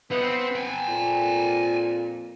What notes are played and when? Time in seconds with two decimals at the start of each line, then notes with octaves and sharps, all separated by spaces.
0.11 B3 D#4 F4
0.22 C4
0.56 G5 G#5
0.88 F2 A#2